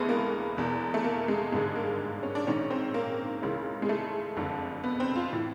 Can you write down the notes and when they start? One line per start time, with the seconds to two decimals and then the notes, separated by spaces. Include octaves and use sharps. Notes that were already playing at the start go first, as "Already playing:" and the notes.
Already playing: D2 C3 E3 G#3 A3 B3
0.09 A#3
0.57 E2 B2
0.94 A3
1.04 A#3
1.28 G#3
1.52 G#1 G2 D3 G#3
1.76 A#3
2.23 C#4
2.35 D4
2.47 A#1 G#2 D#3 C#4
2.70 C4
2.94 A#3
3.42 C#2 C#3 E3
3.82 G#3
3.89 A3
4.36 F#1 F2 D3
4.84 B3
5.00 C4
5.16 F4
5.32 A2 E3